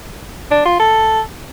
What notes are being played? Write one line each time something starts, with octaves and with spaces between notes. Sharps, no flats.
D4
F4
A4